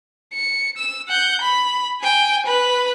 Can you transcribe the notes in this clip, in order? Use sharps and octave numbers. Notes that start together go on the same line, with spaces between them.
C#7
E6
F#5 G6
B5
G5 G#5
B4 B5